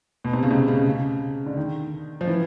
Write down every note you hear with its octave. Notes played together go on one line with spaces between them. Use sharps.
B2
C3
C#3
C3
C#3
C#3
D3
D#3
F3
E3